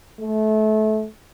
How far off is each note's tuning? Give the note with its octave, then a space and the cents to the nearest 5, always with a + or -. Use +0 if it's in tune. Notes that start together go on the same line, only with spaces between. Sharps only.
A3 -25